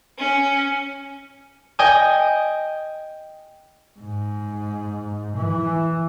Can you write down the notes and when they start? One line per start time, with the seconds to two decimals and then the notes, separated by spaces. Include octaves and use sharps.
0.18 C#4
1.79 D#5 G5 G#5 D#6
4.00 G#2
5.37 E3